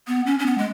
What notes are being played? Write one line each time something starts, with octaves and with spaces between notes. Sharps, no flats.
B3
C#4
C#4
B3
G#3